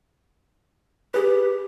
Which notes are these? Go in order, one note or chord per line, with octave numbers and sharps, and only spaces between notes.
G4 G#4 B4